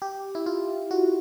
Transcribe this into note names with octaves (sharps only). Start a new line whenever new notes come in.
G4
E4
F4
F#4